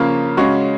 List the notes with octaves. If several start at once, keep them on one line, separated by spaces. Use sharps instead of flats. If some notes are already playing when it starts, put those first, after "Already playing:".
Already playing: C#3 F3 A#3 C#4 F4
C#3 G#3 C#4 F#4 C#5